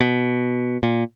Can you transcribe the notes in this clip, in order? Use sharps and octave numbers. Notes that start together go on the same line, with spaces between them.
B2
A#2